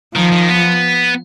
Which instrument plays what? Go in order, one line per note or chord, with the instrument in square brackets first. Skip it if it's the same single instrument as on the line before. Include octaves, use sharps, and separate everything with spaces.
[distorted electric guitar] D#3 [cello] F3
[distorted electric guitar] D#3
B3